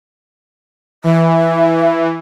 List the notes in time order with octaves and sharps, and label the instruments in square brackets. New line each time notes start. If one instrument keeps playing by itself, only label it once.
[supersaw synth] E3 [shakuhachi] E5